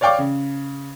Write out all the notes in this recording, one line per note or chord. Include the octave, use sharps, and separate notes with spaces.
C#5 D5 F5 G5 C#6 D6
C#3